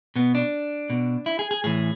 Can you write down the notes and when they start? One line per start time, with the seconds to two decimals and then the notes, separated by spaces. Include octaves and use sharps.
0.16 B2 B3
0.35 D4
0.90 B2
1.26 E4
1.39 G#4
1.51 G#4
1.64 A2 E3 G#4